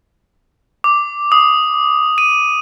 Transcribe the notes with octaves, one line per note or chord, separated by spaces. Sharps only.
D6
D#6
D#7